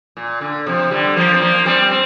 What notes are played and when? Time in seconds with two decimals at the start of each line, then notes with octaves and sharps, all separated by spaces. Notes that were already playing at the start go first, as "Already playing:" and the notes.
0.17 A#2
0.41 D3
0.66 C3 F3
0.91 D3 G3
1.16 F3 A#3
1.34 C4
1.41 F3 A#3
1.66 G3 C4
1.91 C4